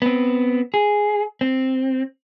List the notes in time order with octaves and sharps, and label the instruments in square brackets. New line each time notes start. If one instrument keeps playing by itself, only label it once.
[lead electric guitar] B3 C4
G#4
C4